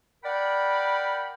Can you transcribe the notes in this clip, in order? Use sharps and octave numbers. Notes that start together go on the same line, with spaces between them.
A#4 D5 F#5 G5 B5